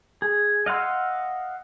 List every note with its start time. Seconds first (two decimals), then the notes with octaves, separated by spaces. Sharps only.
0.22 G#4
0.66 D#5 F5 F#5 C6 E6